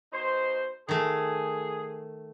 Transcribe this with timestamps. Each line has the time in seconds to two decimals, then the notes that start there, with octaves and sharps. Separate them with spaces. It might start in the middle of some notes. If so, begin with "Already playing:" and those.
0.12 B2 D#4 C5
0.89 D#3 A3 G#4